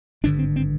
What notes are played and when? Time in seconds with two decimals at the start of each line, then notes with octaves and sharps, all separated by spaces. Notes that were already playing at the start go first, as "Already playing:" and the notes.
0.24 G#1 G2 D3 D4
0.39 C4
0.56 C4